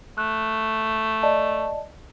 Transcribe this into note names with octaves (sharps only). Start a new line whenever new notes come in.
A3 F#6
D5 D#5 A5